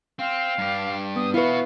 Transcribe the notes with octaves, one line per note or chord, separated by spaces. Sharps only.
C4 F5
G2 G4
B3 D#6
B3 E4 F#4 B4 F5